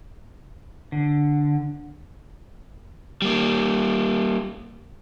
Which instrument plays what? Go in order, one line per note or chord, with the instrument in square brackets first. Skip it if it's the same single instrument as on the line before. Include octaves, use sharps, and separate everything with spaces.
[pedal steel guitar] D3
[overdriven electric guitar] G3 A#3